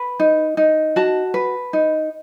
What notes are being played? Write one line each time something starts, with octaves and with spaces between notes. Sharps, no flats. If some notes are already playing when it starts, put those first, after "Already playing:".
Already playing: B4
D#4
D#4
F#4 A5
B4
D#4